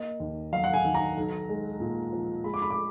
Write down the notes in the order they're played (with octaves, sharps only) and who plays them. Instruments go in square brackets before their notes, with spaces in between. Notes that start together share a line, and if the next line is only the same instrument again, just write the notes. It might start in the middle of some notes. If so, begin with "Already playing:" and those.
Already playing: [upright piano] A#3 D#5
D#2
F#3 F5
F#5
G#5
D#3
A#5
B1
G#3
A#2
F3
G#3 B5
D6
B5
D6